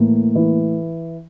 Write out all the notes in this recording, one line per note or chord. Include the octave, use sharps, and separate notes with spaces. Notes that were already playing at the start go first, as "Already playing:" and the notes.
Already playing: A2 E3 A#3
E3